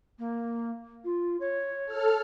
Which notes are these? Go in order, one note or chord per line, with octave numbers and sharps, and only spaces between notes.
A#3
F4
C#5
A4 F6